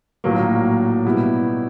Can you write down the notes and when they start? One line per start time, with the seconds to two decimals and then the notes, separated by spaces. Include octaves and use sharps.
0.24 A#1 A2 F#3 A#3
1.06 B2 G3 B3 E4